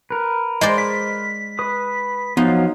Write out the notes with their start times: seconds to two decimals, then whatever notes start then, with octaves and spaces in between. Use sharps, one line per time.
0.10 A#4 B4
0.61 G#3 C5 D5 D#5
0.78 B6
1.59 B4 D#6
2.37 F3 F#3 B3 D#4 F4